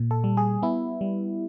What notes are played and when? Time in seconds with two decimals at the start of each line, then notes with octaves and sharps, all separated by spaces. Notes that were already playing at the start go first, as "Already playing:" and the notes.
Already playing: A#2
0.11 A4
0.24 G3
0.37 G#4
0.63 B3 E4
1.01 G3